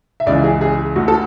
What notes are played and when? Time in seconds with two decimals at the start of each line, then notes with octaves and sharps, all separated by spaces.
0.20 E5
0.26 C#2 C#3 E3 D5
0.44 G#4
0.61 G#4
0.96 D2 D3 F#4
1.08 A4